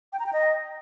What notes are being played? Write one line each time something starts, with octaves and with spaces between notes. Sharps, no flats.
G5
A#5
G5
D#5